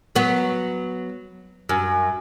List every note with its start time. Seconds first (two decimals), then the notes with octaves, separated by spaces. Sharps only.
0.15 F#3 B3
1.69 F#2